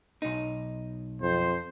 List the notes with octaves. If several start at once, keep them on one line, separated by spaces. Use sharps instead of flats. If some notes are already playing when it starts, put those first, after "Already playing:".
B1 D#4
F2 C5